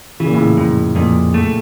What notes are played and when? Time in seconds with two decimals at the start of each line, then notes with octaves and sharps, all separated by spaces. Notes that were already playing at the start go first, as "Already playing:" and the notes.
0.20 C#3 E3
0.27 A#2
0.34 A2 C#3
0.57 F2 A2
0.96 F2 A#2
1.34 A3